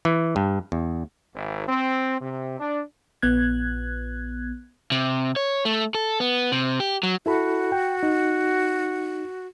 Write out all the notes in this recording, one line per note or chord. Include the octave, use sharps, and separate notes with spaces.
E3
G2
E2
G#1
C4
C3
D4
A#1 B3 F#6 G#6
C3
C#5
A3
A4
B3
C3
G4
F#3
E4 F#4 A4 B5
G5
D#4